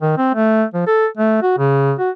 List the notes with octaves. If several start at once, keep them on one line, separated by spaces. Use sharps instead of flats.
D#3
C4
A3
F3
A4
A3
F#4
C#3
F#4